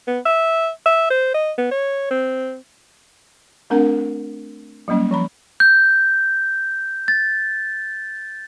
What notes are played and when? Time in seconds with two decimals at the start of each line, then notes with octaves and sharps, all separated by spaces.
0.07 B3
0.25 E5
0.86 E5
1.10 C5
1.34 D#5
1.58 B3
1.71 C#5
2.11 C4
3.70 A3 C4 D4 A#4 F#5
4.88 F#3 G3 A#3 C#4
5.11 F3 A#5 B5
5.60 G6
7.08 A6